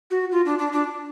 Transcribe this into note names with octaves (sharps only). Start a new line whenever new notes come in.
F#4
F4
D4
D4
D4